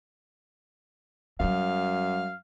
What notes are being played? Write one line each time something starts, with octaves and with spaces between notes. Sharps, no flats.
F#2 F#3 G3 F5